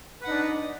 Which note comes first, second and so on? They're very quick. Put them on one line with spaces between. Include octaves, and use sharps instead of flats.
B4 F#5 D#4 D4